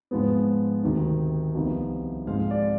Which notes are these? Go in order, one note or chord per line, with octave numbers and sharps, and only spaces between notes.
G#2 F3 G#3 B3
D2 C3 D#3
C2 C3 F3 B3 D#4
G#2 F3 G#3 C4 F5
D5